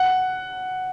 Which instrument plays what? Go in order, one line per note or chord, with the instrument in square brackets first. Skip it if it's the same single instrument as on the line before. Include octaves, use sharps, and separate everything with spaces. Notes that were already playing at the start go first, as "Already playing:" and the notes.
Already playing: [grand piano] F#5